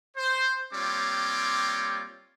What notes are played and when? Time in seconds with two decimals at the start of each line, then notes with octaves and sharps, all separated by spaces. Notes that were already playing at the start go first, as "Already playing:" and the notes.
0.17 C5
0.74 G3 A#3 C4 F4 C#5 D6